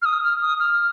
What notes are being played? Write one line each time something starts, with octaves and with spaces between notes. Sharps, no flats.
F6
D#6
F6
D#6
F6